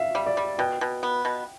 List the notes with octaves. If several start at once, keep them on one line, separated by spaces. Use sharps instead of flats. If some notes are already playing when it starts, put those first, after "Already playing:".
Already playing: E5 F5
G3
D5
G3
B2 G5
B2
B3
B2